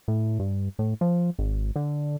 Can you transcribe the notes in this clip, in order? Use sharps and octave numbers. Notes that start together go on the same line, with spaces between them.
A2
G2
A2
F3
G#1
D3